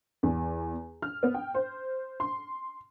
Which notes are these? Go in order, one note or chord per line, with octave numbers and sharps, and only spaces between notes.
E2
F6
B3
G5
C5
C6